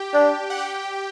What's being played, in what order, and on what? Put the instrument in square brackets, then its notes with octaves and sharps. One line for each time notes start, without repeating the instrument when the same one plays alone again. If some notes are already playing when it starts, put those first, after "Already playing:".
Already playing: [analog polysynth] G4 G5
[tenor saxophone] D4
[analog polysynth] F#5
G4 G5